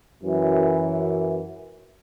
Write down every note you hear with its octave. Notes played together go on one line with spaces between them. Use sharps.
F#2 E3